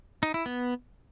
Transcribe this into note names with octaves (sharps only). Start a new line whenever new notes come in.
D#4
E4
B3